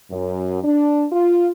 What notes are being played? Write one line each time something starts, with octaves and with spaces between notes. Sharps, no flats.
F#2
D4
F4